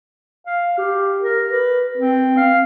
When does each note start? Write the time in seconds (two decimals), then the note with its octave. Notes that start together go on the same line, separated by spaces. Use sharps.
0.47 F5
0.78 G4
1.21 A#4
1.50 B4
1.97 C4
2.37 F5